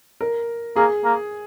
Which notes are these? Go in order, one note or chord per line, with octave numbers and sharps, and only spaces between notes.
A#4
A#3 G#4
A#3